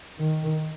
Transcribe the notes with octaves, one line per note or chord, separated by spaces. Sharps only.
D#3